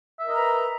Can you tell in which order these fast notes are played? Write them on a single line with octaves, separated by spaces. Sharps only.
E5 A#4 D#5 A#5 B4